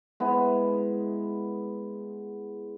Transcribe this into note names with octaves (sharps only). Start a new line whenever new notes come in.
G#3 B3 E4